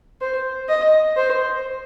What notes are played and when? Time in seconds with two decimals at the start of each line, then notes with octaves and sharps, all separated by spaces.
0.21 C5
0.69 D#5
1.17 C5